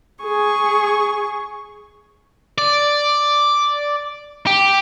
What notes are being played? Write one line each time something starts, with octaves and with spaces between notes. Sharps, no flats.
G#4 C#6
D5
G4